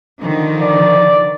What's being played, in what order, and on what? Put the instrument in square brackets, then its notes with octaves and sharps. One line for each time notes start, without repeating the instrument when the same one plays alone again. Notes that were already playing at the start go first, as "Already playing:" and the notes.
[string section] D3 D#3 F3
[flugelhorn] D5